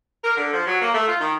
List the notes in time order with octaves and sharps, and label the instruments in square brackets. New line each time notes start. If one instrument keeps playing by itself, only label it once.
[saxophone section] A#4
D3
F3
F#3
A#3
A3
F4
D#3